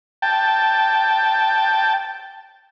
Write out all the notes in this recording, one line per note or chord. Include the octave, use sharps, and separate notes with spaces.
G5 A5